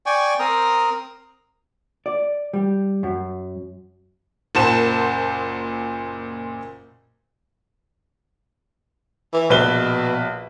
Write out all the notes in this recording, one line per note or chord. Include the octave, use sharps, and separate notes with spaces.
D5 G5 G#5 C#6
C4 A#4 A#5 D#6
D5
G3
F#2
F#1 A#2 C5 F#5 A5 E7
E3
A#1 B2 B4 G7